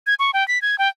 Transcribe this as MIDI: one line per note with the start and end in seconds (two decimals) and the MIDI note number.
0.07 0.14 92
0.19 0.31 85
0.34 0.46 79
0.48 0.61 95
0.62 0.78 92
0.79 0.89 79